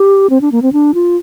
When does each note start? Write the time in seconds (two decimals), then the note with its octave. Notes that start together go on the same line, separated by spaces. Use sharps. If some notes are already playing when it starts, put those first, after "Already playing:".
Already playing: G4
0.30 C4
0.41 D4
0.52 A#3
0.62 C4
0.73 D4
0.94 F4